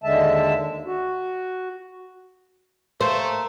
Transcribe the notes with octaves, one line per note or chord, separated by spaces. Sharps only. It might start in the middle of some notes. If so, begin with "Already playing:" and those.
D#2 D3 G#3 E5 A5
F#4
A3 A#3 C5